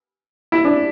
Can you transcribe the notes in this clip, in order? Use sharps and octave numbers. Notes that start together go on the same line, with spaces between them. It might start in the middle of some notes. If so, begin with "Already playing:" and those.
E4
D4